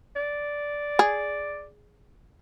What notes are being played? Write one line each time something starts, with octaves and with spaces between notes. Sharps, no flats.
D5
G#4